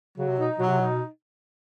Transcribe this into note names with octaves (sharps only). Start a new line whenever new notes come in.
C#3 F#3
C3
B2 D#4
B2 F#3
C3
B2 D#4